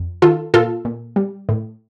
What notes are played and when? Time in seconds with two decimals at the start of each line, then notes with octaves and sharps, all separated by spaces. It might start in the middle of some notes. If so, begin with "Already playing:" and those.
Already playing: F2
0.22 D#3 F4 A4
0.54 A#2 F4 A4
0.85 A#2
1.16 G3
1.49 A2